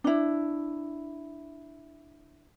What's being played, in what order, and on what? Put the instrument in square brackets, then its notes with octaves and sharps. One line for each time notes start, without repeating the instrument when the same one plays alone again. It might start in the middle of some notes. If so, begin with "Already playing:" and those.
[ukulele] D4 E4